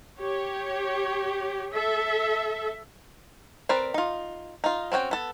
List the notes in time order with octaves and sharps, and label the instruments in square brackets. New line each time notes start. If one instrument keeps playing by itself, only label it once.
[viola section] G4 C#5
A4 E5
[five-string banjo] C4 A#4 B4 D5
D#4 F4
D#4 F4
C4 C#4 F#4 G5
B3 A4